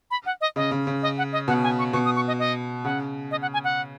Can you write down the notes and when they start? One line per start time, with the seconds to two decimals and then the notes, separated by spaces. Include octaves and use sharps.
0.11 B5
0.26 F#5
0.41 D#5
0.56 C#3 D#5
0.71 C#3
0.87 C#3
1.03 D#5
1.18 F#5
1.32 D#5
1.48 B2 F#5
1.63 G#5
1.79 C#6
1.93 B2 C#6
2.05 D#6
2.16 C#6
2.27 D#5
2.39 D#5
2.84 C#3 F#5
3.31 D#5
3.42 F#5
3.53 G#5
3.64 F#5